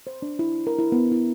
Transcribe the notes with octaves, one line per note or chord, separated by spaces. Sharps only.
C5
D4
E4
A#4
E4
B3
E4